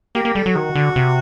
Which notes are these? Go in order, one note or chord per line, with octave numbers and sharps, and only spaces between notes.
A#3 G4
A#3
G3 A4
F#3
D#3 F#4
D3
C3